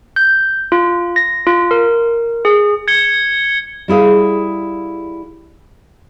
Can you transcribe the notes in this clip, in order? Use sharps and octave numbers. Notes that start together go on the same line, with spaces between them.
G6
F4
A#6
F4
A#4
G#4
G#6 C#7 G7
G3 E4 G#4 F5